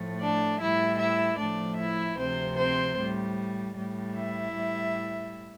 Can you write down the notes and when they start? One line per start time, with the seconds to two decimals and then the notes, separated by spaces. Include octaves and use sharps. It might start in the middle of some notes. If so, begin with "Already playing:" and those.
Already playing: A2 F3 A3
0.22 D4 D5
0.60 A2 G3 E4 E5
0.99 E4 E5
1.39 A2 F3 A3 D4 D5
1.79 E4 E5
2.19 D2 C3 F3 C4 C5
2.58 C4 C5
2.98 A2 G3
3.77 A2 G3
4.16 E4 E5
4.55 A2 G3